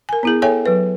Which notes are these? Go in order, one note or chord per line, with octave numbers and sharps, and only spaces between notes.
A#4 G#5
B3 E4 G#4
A4 C#5 E5 G5 G#5
F#3 B4